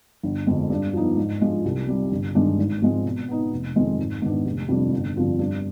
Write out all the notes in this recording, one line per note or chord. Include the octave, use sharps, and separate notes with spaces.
G1
F2 D3 G#3 C4
G2
F3 B3 D#4
G#2
F3 G#3 D4 F4
C2
C3 G3
G1
G2 D#3 G#3 D4
G#1
G#2 F3 G#3 C4
B2
B3 D#4
F1
F2 D#3 G#3 C4
G#1
G#2 D#3 B3 D4
F1
F2 C3 G3 D4
G1
G2 D3 F3 C4
G2